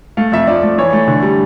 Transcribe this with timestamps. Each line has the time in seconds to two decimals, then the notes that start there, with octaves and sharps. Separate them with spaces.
0.17 A3 F5
0.32 F2 E5
0.47 F3 D5
0.63 A3
0.78 E3 C#5
0.93 A3
1.08 D3
1.23 G3